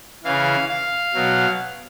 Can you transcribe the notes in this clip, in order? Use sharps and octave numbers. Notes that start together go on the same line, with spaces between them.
C#3 E3 F5
F5
B2 F#3